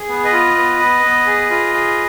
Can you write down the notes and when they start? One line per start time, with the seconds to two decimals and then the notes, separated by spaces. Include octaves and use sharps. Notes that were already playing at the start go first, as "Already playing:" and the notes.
Already playing: G#4
0.08 B3
0.24 B4 D#5
0.33 F4
0.56 B3
0.79 B3
1.03 B3
1.26 G#4
1.50 F4
1.74 G#4